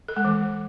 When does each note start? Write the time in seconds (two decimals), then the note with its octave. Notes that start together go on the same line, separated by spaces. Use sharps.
0.08 A4
0.17 G#3
0.25 E3